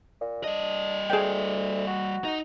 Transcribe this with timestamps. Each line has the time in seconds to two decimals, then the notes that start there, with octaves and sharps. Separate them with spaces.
0.20 A#2
0.44 G3 D4 D#5
1.10 D2 G#4 G5
1.87 F#4
2.25 D#4